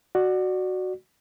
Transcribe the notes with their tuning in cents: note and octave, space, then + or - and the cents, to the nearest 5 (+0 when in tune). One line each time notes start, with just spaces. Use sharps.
F#4 +0 D5 +25